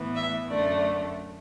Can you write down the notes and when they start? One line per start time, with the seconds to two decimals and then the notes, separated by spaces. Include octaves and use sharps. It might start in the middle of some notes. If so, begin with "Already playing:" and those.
Already playing: A2 E3 B3
0.15 E5
0.48 F#2 D3 A3 D5